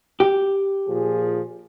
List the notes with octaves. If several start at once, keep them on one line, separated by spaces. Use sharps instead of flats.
G4
A#2 F3 G#4